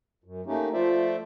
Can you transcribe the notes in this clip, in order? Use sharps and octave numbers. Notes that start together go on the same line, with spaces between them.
F#2
A3 A#3 C#4 D#4 G4
F3 A3 F4 C5 D5 E5